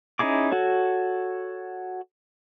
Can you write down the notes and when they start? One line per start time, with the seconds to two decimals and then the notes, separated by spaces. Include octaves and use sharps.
0.19 C#4 D#4 E4 G#4 D6
0.52 F#4 A4 C#5